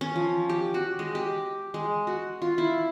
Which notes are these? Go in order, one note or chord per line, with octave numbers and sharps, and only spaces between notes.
C#4
F3
G4
F#4
G#3
G4
G#3
F#4
F4
E4